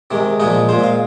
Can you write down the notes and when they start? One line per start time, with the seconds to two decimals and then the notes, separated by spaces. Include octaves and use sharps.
0.11 C3 D#3 G#3
0.40 A#2 F3 G#3 D#4
0.69 A#2 G#3 C5
0.83 F5